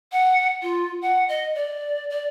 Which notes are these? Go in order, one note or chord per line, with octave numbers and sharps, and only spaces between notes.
F#5
F4
F#5
D#5
D5
D5